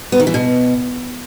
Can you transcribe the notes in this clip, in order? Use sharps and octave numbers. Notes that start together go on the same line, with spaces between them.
B3
D#3
E3
B2